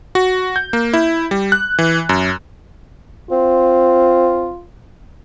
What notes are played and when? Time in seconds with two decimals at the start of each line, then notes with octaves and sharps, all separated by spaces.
0.15 F#4
0.56 G6
0.73 A#3
0.93 E4
1.31 G3
1.52 F#6
1.79 E3
2.09 F#2
3.31 C4 F4